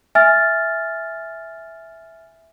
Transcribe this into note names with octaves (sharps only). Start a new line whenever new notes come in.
E5 G#5 F6 A6